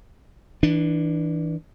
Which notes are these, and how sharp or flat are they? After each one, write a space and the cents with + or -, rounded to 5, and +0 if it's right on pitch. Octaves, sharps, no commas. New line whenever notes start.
E3 -20 D4 +10